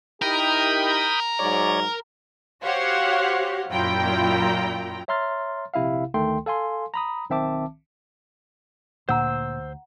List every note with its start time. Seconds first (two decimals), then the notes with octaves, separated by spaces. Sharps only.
0.22 D#4 E4 G4 A#4 G5 B5 D#6
1.39 G#2 F#3 C#5 D5
2.63 F#4 G4 C5 C#5 F5 F#5
3.68 F#2 A#2 E4 F4 G5 A#5
5.08 C#5 E5 A#5 C6 F6 A6
5.74 A#1 C3 E4 E5 F5
6.14 D2 D#3 A3 A4 G5 C6
6.46 A4 F5 G#5 C6
6.94 A#5 B5 D#6
7.30 B1 D#3 C4 E5 A5 D6
9.09 D2 A#2 C5 F#5 A#5 E6